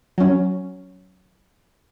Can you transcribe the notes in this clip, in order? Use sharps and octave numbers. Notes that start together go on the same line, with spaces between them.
F#3 C#4